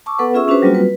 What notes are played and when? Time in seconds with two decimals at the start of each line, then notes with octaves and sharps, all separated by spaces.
0.06 A5 C#6 D6 E6
0.19 B3 A4 B4 F#5
0.34 C#4 F4 G#4 E5 C#6 E6
0.48 C#4 D4 F#4 G#4 B4 C5
0.62 F#3 G3 A#3 C4 F4 F#4
0.74 B4